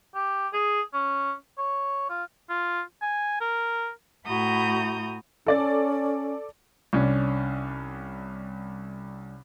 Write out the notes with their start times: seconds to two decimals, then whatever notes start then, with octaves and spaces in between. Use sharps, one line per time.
0.15 G4
0.53 G#4
0.93 C#4
1.58 C#5
2.09 F4
2.50 F4
3.02 G#5
3.41 A#4
4.26 A2 E4 F#4 A#5 D#6 G6
5.47 C#4 A4 D5 A6
6.93 C2 C#4 D4